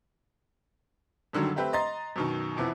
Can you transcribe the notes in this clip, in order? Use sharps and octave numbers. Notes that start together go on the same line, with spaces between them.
F#2 D3 D#3 F#3 G3
A3 C4 G4 B4
D#5 A#5 C6 A6
F#2 B2 D#3
F2 C3 E3 B3